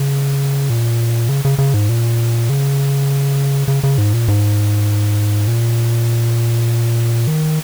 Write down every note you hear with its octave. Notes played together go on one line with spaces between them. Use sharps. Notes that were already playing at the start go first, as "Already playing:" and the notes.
Already playing: C#3
A#2
C#3
C#3
C#3
G#2
A#2
C#3
C#3
C#3
G#2
A#2
G#2
A#2
D#3